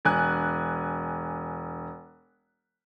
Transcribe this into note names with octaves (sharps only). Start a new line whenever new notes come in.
E1 G#5 F#6